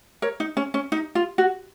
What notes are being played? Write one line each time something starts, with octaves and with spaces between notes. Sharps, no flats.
A#4 C#5
D#4
C#4
C#4
D#4
F4
F#4